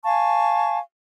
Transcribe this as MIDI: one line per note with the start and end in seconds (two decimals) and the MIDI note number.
0.04 0.78 77
0.04 0.78 80
0.04 0.78 81
0.04 0.78 85